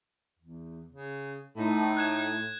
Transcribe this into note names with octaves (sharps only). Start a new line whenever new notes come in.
E2
C#3
A2 D#4
F#6 G#6 E7